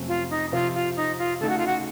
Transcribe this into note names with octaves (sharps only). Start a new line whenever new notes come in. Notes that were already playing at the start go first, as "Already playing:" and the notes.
Already playing: F2 C3 F#3 A3 C#4
F4
D#4
C3 F3 C4 F4
F4
D#4
F4
C#3 A3 D#4 A4
F#4
F4
F#4